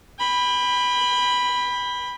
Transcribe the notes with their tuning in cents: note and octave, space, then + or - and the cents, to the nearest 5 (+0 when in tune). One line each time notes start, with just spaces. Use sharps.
G5 +35 B5 +0